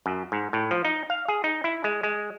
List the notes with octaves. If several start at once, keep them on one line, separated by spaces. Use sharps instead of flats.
F#2
G#2
A2
F3
D#4
F5
G#4
D#4
E4
G#3
G#3